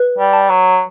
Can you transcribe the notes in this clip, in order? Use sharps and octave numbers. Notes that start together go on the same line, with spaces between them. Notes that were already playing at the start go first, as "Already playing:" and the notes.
Already playing: B4
G3
A5
F#3